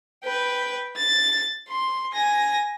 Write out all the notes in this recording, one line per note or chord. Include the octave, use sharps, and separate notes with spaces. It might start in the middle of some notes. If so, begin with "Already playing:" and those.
B4 G5
A6
C6
G#5 A#6